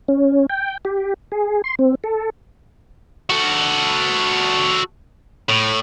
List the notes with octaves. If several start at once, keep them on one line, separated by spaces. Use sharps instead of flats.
C#4
G5
G4
G#4
C6
C4
A4
F#4 A4
A2